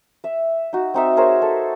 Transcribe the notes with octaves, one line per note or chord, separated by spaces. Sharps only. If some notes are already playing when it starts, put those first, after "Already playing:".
E5
D#4 F#4
C4 D#4 E5
G#4 A#4 C5 C#5
A4